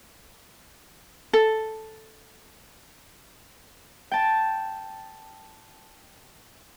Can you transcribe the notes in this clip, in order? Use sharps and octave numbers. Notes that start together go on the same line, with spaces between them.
A4
G5 A5